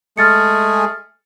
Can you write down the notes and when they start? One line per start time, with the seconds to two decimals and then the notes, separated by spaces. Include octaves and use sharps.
0.18 G#3 A3 G#4 F6 A6 C#7